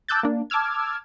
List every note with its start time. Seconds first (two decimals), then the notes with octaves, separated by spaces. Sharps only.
0.08 A5 D6 E6 F#6 G6 A6
0.23 A#3 D4
0.50 A5 D6 E6 F6 G#6